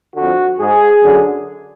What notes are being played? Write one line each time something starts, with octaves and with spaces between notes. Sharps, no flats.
F2 D3 F#4
G#2 G#4
F#2 D3